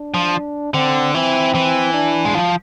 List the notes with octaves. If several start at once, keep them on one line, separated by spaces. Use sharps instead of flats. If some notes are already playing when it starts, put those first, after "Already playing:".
Already playing: D4
F3
D3 C4
E3 C4
E3
D4
G#3
F3